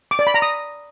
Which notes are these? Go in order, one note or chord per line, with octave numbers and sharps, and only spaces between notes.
D6
D5
B5
A#5
D#6